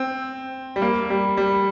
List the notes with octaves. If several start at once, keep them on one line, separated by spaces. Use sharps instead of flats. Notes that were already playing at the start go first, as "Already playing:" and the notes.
Already playing: C4
G3
A#3
G3
G3